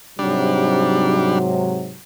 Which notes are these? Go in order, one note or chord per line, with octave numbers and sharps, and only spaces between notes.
G#2 C3 F#3 G3 D4